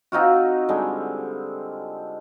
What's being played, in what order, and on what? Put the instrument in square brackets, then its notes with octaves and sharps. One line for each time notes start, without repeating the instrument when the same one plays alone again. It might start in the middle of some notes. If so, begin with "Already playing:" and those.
[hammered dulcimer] C4 D#4 F4 F#4
D3 G3 G#3